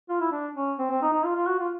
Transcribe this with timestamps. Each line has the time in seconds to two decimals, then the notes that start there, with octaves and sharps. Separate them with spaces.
0.09 F4
0.21 E4
0.32 D4
0.55 C#4
0.79 C4
0.90 C4
1.02 D#4
1.13 D#4
1.24 F4
1.36 F4
1.47 F#4
1.60 F4